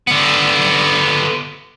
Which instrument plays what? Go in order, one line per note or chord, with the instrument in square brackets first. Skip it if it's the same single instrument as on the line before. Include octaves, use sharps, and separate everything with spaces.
[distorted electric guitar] D3 B3